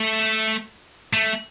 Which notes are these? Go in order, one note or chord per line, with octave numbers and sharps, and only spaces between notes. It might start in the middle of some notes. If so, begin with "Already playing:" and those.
Already playing: A3
A3